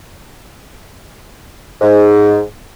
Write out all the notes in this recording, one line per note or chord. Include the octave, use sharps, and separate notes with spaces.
G#2